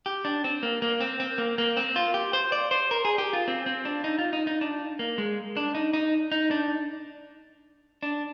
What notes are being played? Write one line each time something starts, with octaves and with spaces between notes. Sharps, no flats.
G4
D4
C4
A#3
A#3
C4
C4
A#3
A#3
C4
F4
G4
C5
D5
C5
A#4
G#4
G4
F4
C4
C4
D4
D#4
F4
D#4
D#4
D4
A#3
G#3
D4
D#4
D#4
D#4
D4
D4